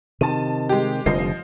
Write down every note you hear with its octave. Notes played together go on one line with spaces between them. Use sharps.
C3 D#3 A5 D#7
G#3 G4
F1 D3 F3 G3 D#5 C7